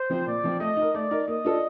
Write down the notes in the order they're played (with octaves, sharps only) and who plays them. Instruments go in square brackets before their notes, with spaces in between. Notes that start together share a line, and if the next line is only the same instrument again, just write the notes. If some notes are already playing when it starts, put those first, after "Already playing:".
Already playing: [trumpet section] C5
[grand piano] F3 C4 F4
[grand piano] A#2 [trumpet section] D5
[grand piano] F3 C4 F4
[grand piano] A3 [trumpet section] D#5
[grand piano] D#4 A#4
[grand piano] A3 [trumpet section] D5
[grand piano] D#4 A#4
[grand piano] A#3 [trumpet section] D#5
[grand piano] D4 F4 A4